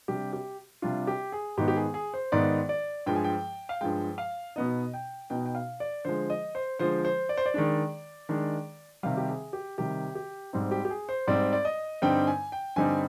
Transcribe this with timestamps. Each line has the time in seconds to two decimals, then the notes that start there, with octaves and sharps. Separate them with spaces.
0.08 C3 G3 D4 G4
0.33 G4
0.82 C3 G3 D4 F4
1.07 G4
1.32 G#4
1.57 G#2 D#3 B3 D#4 G4
1.68 G4
1.76 G#4
1.94 G#4
2.14 C5
2.32 G#2 D#3 B3 D#4 D5
2.69 D5
3.06 G2 F3 G#3 G5
3.15 G#5
3.24 G5
3.69 F5
3.81 G2 F3 G#3 G5
4.18 F5
4.56 B2 B3 D#4 D#5
4.94 G5
5.30 B2 B3 D#4 G5
5.46 G5
5.55 F5
5.80 D5
6.05 D3 F3 G#3 C5
6.30 D#5
6.55 C5
6.79 D3 F3 G#3 C5
7.05 C5
7.29 D5
7.37 C5
7.46 D5
7.54 D#3 G#3 D4
8.29 D#3 G#3 D4
9.03 C3 D#3 G3 F5
9.17 G4
9.29 G#4
9.53 G4
9.78 C3 D#3 G3 G4
10.15 G4
10.53 G#2 G3 C4 D#4
10.71 G4
10.85 G4
10.90 G#4
11.09 C5
11.27 G#2 G3 C4 D#4 D5
11.53 D5
11.65 D#5
12.02 G2 D3 G3 C4 D#4 G5
12.27 G#5
12.52 G5
12.76 G2 D3 G3 C4 D#4 G#5